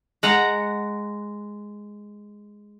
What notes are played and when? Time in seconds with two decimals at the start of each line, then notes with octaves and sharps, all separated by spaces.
0.23 G#3 F#5 A#5